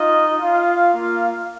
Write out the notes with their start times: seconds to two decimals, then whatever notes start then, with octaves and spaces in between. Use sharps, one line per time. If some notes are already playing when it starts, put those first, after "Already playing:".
Already playing: D#4 F4 D#5
0.40 F4 F5
0.93 A#3 F4